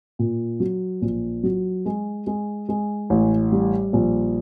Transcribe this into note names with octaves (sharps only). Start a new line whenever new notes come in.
A#2
F#3
A#1
F#3
G#3
G#3
G#3
A1
G3
A#1